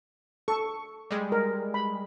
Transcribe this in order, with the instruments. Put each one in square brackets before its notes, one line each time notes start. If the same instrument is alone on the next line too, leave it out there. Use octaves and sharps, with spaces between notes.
[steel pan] A4 [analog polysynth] C#6
[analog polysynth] G3 G#3
[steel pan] A#4
B5